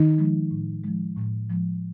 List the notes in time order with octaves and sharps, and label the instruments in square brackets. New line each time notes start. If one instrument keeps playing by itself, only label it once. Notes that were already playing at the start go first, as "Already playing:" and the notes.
Already playing: [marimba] D#3 D#4
F3 G#3
A2
F3 G#3
A2
F3 G#3